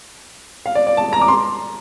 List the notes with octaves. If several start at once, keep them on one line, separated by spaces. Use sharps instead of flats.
F5
D5
D5
A5
A#5
D6
C6